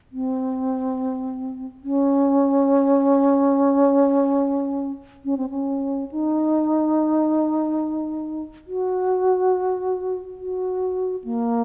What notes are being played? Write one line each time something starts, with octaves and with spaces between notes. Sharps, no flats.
C4
C#4
C#4
C4
C#4
D#4
F#4
F#4
A#3